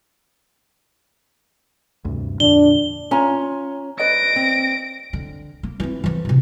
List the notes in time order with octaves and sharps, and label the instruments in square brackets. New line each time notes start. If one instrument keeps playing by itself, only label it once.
[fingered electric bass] D2 G2 C3
[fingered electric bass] F2 A#2 D3 [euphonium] D4 [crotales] G7
[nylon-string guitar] C#4 [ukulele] F4 G#5 A#5
[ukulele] B4 D5 D#5 [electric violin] A#6 D7
[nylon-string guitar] C4
[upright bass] D3
A#3
E3 C4
E3 F3
A2 C3